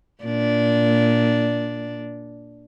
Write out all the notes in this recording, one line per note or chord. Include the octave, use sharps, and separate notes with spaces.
A#2 D4